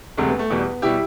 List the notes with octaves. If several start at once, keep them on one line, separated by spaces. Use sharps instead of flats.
E1 D2 C3 A3
B3
A3
E2 B2 G3 B3
B2 G3 E4 G4